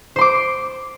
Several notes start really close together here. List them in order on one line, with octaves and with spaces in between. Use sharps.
C5 C6 D6